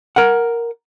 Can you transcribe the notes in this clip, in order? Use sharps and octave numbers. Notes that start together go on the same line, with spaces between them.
A#4 F#5